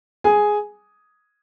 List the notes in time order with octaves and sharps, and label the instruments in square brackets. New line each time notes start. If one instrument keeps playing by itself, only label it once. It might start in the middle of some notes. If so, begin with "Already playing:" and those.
[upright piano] G#4 G#5